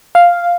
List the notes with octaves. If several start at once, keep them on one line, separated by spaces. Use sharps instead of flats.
F5